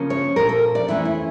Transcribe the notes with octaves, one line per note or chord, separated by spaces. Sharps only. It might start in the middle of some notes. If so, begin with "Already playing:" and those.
Already playing: C#3 F3 A#3 C#4
C#5
A#2 F3 C#4 A#4
A4
D5
F2 E3 A3 C#4 E4
E4